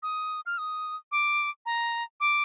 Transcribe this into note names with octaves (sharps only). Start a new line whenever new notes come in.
D#6
F6
D#6
D6
A#5
D6